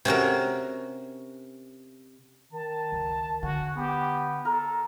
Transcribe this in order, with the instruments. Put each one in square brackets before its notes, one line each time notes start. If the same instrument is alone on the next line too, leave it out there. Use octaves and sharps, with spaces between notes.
[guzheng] C3 C#4 F#4 A#4
[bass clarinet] D#3 [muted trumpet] A5
[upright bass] C#2
[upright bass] D3 [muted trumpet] F#4 [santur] G#5
[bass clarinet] B3 [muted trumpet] G4
[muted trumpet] A4 [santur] A#4